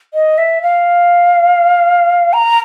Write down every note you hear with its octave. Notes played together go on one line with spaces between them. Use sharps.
D#5
E5
F5
A#5